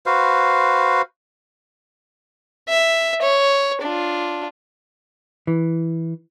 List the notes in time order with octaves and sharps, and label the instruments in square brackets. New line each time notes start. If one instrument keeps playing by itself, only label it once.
[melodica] F#4 B4 C5 F5
[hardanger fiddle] E5
C#5
D4 F4
[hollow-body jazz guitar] E3